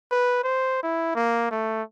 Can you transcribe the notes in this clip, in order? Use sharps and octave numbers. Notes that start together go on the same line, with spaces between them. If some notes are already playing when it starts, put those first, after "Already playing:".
B4
C5
E4
A#3
A3